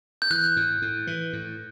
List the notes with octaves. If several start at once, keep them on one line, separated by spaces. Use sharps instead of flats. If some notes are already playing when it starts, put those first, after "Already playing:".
G6
E3 F#6
A2
A2
E3
A2